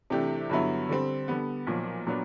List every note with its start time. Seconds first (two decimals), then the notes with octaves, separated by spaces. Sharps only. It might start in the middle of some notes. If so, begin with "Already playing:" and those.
0.10 C3 E3 A3 D4 G4
0.50 G2 D3 F#3 B3 E4
0.89 D3 G3 C4
1.28 D3 G3 B3
1.67 B1 A#2 F3
2.07 A#2 F#3 B3 D4